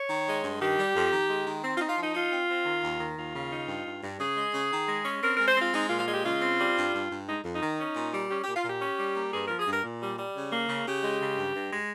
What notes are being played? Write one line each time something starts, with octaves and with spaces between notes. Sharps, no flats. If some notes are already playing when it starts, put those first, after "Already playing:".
Already playing: C#5
D#3
G#3
G2
D#3 G4
G3
F2
D#3
G#3
D#3
C4
F4
D#4
F4
F3 D#4
D#4 F4
C4
C4
D#3
D#2
D#3
D#2 F4
C#3
D#4
G2
G2
G2
C#3 G#4
G#3
C#3
D#3
G#3
C#4
C4 A#4
G#3 A#4
C5
C4 F4
G#3 D#4
F4
A#2
F4
G#3 G4
C#3 F4
C4
G3
G2
G2
G2
G#3 D#4
F2
D#4
D#3
C#4
A#2
G3
C#4 G4
A#2 G4
F4
A#2 G4
C#4
G3
A#3
G2 G#4
F3 A#4
G#4
G2
A#4
A#2
G3
G3
C#3
A#3
C#3
C#3 G4
G#3
C#3
G2
G2
G#3